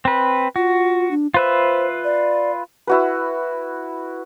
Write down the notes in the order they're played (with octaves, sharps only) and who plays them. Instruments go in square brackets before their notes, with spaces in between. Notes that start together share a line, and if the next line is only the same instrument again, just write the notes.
[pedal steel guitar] C4 B4
[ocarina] F4 [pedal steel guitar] F#4
[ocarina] D4
[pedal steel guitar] F4 B4 E5 [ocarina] C5
[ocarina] D5
[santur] E4 F#4 B4